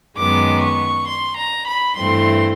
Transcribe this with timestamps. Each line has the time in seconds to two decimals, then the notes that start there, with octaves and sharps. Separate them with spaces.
0.17 F#2 D#3 G#3 B3 D6
0.63 C#6
1.08 C6
1.38 A#5
1.68 B5
1.97 G2 E3 A3 C4 C6